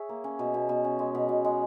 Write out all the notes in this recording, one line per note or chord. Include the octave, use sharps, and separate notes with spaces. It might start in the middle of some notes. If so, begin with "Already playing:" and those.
Already playing: G#4 C#5 E5
A#3
C#4
B2
B2
B2
C#4
G#3
B2
B2
G#3